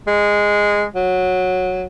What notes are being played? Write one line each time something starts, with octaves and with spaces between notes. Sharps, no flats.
G#3
F#3